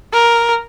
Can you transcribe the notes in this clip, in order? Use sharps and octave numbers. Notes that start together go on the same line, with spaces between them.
A#4